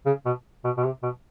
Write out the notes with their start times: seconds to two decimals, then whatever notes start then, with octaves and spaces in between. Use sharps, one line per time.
0.06 C#3
0.25 B2
0.64 B2
0.77 B2
0.84 C3
1.03 B2